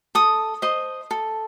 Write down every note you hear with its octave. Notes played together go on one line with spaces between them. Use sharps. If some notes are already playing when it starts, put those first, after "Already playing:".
A4 D#6
C5 D#5
A4